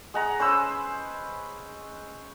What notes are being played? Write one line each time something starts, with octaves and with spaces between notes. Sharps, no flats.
G#3 F#5 A#5
C#4 B4 C5 E6